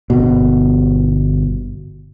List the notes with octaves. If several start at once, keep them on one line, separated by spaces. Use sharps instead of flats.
G1 B2